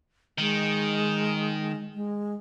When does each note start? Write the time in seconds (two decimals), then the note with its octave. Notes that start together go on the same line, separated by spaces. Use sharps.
0.38 D#3 G#3
1.94 G#3